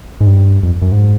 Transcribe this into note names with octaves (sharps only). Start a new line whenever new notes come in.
G#2
G2
F2
F#2
G#2